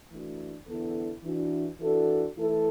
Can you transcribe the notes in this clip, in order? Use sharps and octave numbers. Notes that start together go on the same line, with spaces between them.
E3 A3 D4 F#4
E2 D3 B3 E4 A4
E3 D4 F#4
E3 D4 F#4 A4
E3 A3 E4 A4